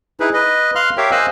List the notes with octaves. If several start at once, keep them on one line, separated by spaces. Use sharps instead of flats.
D#4 E4 G#4 B4
B4 D#5
F5 C6 F6 F#6
G4 A#4 C#5 E5 F5 G5
C5 D#5 F5 G#5 E6 F#6